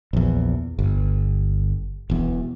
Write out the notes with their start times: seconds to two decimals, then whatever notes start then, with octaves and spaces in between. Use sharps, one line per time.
0.13 A#1 E2
0.79 G1
2.10 E1 E2